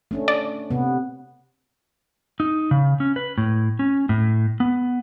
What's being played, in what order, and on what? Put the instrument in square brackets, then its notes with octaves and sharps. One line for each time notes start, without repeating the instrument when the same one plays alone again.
[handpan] A3 C#4 D4
[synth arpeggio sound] D5
[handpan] C3 B3
[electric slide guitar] D#4
C#3
C#4
B4
A2
C#4
A2
B3